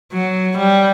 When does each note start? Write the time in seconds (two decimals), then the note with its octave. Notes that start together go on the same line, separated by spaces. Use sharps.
0.13 F#3
0.58 G3